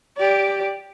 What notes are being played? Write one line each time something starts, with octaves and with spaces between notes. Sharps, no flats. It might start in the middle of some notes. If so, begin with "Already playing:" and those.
G4 D5